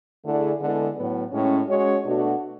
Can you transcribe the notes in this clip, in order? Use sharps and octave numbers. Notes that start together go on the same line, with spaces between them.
D3 A3 E4 G#4 D5
D3 G#3 B3 E4 A4
A2 F#3 B3
A2 G#3 C#4
G#3 C#4 F#4 C#5
B2 A3 D4 F#4